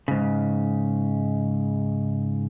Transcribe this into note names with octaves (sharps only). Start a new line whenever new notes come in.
G#2 C#3